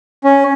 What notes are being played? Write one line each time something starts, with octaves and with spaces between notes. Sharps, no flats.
C#4